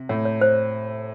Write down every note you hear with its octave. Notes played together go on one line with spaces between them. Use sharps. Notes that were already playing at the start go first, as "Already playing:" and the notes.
Already playing: C3
A2 C#5
C#5
C5